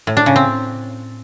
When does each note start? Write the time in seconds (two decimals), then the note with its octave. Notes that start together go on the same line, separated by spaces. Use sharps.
0.07 A2
0.17 D4
0.26 C#3
0.36 C4